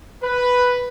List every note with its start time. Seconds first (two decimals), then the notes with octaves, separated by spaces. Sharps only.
0.23 B4